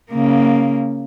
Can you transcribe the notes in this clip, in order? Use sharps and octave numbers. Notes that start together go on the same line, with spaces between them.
C#3 A#3